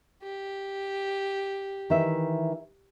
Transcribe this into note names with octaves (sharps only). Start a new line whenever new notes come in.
G4
D#3 E3 E5